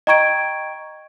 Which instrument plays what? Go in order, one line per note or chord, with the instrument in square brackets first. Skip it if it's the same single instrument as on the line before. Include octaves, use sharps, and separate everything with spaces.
[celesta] D#5 G5 A#5 C#6 G#6 D7